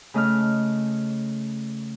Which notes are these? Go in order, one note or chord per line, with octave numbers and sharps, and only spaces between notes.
C#3 A3 D#5 D#6 F6